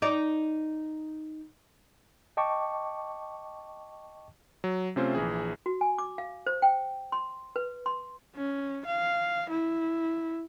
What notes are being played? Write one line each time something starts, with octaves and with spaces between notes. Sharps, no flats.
D#4 D5
D#5 G5 A5 C#6 D6
F#3
C3 A3 C4 C#4 F4 C5
A#1 E3 G#4
F#4
G#5
D6
F5
C5
G5
C6
B4
C6
C#4
F5
E4